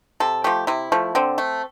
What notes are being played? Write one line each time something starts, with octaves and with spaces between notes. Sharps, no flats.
C3 A4
F3 A3 G4
C3 E4
F3 A3
D3 C4
A3